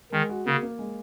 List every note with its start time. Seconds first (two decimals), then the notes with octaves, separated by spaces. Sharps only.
0.12 D#3 G#3
0.29 F#4
0.46 C#3 A#3
0.63 A#3
0.79 G#3